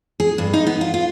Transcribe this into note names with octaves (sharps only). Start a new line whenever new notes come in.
G#4
G2
D#4
B3
F4
F4